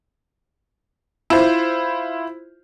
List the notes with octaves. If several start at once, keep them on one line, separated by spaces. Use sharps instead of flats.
E4 F4 C5